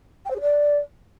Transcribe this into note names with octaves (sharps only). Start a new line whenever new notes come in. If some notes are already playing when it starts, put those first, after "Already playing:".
G5
C5
G#4
D5